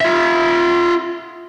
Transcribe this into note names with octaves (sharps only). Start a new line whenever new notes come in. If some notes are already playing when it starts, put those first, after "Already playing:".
F4 E5